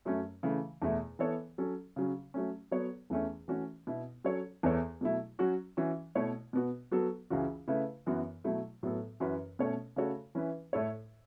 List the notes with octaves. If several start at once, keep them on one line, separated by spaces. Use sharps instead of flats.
F#2 F#3 A3 C#4
C#3 E3 A3
E2 B2 A3 E4
E3 B3 A4 C#5
F#3 C#4 A4
C#3 F#3 C#4
F#3 A3 C#4
F#3 B3 A4 C#5
E2 E3 A3 C#4
E3 A3 C#4 F#4
B2 B3 E4
F#3 C#4 A4 C#5
E2 E3 B3 A4 C#5
B2 F#3 A3 E4
F#3 C#4 F#4
E3 C#4 F#4
B2 A3 E4 C#5
B2 B3 F#4
F#3 B3 F#4 A4
C#2 C#3 E3 C#4 F#4
C#3 A3 E4 B4
F#2 E3 B3 F#4
B2 F#3 A3 E4
A2 F#3 B3 A4
F#2 E3 C#4 F#4 B4
B2 A3 C#4 A4 C#5
C#3 A3 F#4 A4 C#5
E3 C#4 E4 B4
A2 A3 E4 A4 C#5